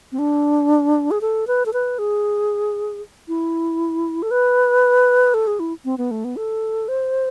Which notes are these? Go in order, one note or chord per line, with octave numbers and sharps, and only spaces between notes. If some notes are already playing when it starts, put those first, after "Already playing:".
C4
D4
G#4
A4
B4
A4
B4
G#4
E4
A4
B4
A4
G#4
E4
C4
B3
A3
B3
A4
C5